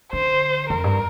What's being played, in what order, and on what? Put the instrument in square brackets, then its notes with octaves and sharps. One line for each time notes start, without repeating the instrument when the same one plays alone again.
[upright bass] D3 [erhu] C5
[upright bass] F2 [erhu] A#4
[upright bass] G2